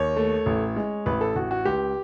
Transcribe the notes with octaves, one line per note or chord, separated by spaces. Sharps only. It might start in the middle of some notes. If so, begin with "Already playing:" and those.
Already playing: D#2 C#5
A3
A1
G#3
A1 B4
A4
A1 F#4
F#4
C#2 G4